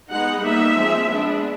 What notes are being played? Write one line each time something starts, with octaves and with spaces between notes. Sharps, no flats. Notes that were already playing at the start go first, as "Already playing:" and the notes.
G#3 B3 D#4 F#5
G3 A#3 D#4 E5
F3 G#3 C4
G#3 B3 D4